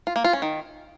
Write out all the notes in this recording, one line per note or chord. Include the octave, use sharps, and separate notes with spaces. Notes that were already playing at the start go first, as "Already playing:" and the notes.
F4
A#3
F4
C#4
D#3